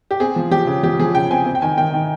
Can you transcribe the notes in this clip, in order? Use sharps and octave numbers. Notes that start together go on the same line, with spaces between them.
G4
C4 G#4
F3
F3 G4
C#3
F3 G4
F3 G#4
C#3 G5
C4 G#5
C4
G5
D#3 G#5
D#3 G5
D#3